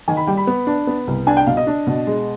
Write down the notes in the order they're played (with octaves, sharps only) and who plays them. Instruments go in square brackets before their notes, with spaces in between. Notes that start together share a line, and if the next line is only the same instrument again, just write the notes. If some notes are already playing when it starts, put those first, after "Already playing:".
[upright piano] D#3 G#5
B5
G3 G5
B5
B3
D4
B3
C2
D4 G#5
G5
B2 F5
D#5
D4
B2
G#3